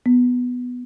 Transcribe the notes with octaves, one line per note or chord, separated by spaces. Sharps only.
B3